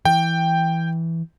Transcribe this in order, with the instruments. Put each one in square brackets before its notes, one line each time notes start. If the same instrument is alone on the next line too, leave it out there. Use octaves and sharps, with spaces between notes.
[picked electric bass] E3 [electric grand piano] G5